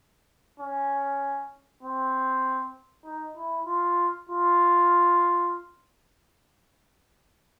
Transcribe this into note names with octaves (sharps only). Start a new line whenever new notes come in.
C#4
C4
D#4
E4
F4
F4